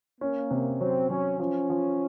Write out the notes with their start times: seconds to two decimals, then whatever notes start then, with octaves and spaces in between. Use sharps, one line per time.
0.21 A#3 C#4
0.51 C3
0.80 F#3 C4
1.10 F#3 C#4
1.40 F3 C#4
1.70 F3